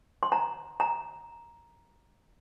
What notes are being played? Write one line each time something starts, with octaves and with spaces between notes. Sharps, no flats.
C6
A#5
A#5